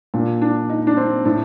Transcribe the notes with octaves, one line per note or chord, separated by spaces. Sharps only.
A#2 D4
D4
D#4
D4
C4
A2 D4